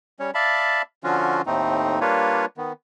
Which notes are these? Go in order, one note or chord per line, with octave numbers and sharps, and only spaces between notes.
G3 C#4 C#5
D5 E5 F5 A5 B5
D3 F3 C#4 F4 F#4
D#2 A2 A3 C4 D#4
G3 A#3 D4 F4 B4 C#5
D#3 B3